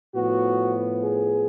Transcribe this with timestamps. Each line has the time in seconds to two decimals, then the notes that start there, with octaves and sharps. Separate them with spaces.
0.14 A2 F3 B3 F#4
1.02 G#4